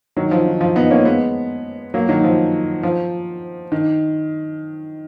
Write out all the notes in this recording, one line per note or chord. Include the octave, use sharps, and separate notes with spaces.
D#3 F#3
F3
D#3
F3
B3 D#4
A#3 C#4
G#3 B3
F#3 A#3
D#3 F#3
F3
F3
D#3